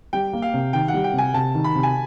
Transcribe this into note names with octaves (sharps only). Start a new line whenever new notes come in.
G3 G5
A#3
F5
C3
D#3 G5
F#5
G3
G5
C3
G#5
C3 A5
D#3
B5
C3
G#5